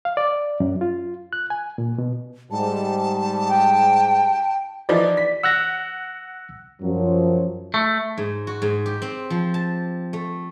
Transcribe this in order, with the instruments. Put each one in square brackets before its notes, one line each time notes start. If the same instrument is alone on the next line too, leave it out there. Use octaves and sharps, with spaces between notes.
[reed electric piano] F5
D5
F#2
F4
F#6
G#5
A#2
B2
[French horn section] G#2 G3 [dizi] A5
[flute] G5
[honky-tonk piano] E3 F3 D#4 [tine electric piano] D5
[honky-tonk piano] B6
[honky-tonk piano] F#5 [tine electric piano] E6 F#6 A#6
[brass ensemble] F#2 F3 F#3
[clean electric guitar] A3
[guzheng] G#2
F#4
G#2
G4
C4
F3
A5
A3